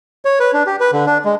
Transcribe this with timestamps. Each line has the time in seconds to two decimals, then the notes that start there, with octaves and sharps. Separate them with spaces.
0.25 C#5
0.40 B4
0.53 D4
0.66 G4
0.80 B4
0.92 D3
1.06 D4
1.25 G#3